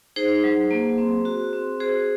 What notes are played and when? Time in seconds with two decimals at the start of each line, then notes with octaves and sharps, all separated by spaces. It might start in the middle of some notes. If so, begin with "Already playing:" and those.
0.16 D#4 G#4 C5
0.44 F#3
0.71 A#3
0.98 C4
1.25 F#4
1.53 C4
1.80 F#4 G#4 C5